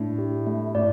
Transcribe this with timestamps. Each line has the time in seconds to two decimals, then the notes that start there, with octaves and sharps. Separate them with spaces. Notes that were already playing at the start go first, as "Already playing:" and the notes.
Already playing: A2 D4
0.18 G4
0.47 A3
0.75 A2 D5